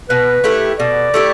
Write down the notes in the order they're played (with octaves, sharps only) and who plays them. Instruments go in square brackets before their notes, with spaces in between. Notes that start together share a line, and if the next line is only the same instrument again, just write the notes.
[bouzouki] B2 [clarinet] B4
[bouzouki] A3 E4 G4
[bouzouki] B2 [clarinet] D5
[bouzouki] A3 E4 G4